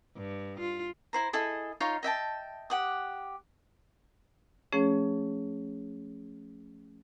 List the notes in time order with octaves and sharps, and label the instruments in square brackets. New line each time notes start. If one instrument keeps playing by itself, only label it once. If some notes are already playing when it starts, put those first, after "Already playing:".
[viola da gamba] G2
F4
[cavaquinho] E4 C5 A#5
E4 G#4 A4 D#5
D#4 F4 C#5 F5
D#5 E5 G5 A5
G4 F#5 D#6
[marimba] F3 A3 C#4 G#4 C#5